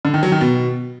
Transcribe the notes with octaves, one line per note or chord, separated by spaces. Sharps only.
D3
D#3
F#3
D#3
B2